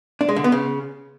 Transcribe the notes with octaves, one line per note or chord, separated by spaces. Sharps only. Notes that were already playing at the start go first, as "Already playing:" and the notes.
D4
G#3
D3
B3
C#3